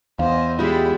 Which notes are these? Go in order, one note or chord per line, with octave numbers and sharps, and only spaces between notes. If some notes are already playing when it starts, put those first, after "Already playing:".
E2 C5 D#5 F5
G3 G#3 E4 F4 B5